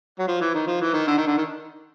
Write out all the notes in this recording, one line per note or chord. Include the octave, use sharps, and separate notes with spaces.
F#3
F3
E3
D#3
F3
E3
D#3
D3
D#3
D3
D#3